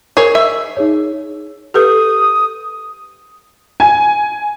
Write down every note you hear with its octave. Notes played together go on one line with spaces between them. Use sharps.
G#4 A#4 C#5
D#5 E5 E6
D#4 G#4 C#5
G4 A4 B4 D#6
G#5